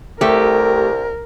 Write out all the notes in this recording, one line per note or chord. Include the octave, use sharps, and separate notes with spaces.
C2 A3 G4 A#4